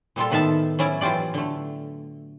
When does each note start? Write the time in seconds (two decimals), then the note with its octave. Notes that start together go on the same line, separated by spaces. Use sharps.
0.16 A#2 G3 F4 A4
0.31 A2 D#3 B3 E5 F5 A5
0.79 F#3 C#4 E4 D5
1.01 E3 F#3 F4 G4 D5
1.34 D3 A3